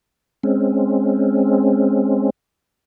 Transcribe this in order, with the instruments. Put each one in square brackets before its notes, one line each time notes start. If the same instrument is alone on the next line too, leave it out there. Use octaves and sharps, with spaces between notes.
[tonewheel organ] G#3 C4 C#4